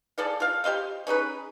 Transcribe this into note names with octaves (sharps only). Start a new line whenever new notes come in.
G#4 A4 D5 F5
F4 F5
G4 C5 D#5 F5
C#4 D#4 G#4 B4